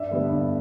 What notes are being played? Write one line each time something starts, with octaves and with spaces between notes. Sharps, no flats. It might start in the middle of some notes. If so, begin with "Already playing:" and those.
Already playing: G2 D5 E5
D3 G3 B3
G2